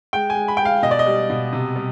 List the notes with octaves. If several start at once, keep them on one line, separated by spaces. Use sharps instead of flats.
G#3 G5
G#5
G#3
B5
G#3 G5
F5
B2 D#5
D5
D#5
G3
B2
C3
G3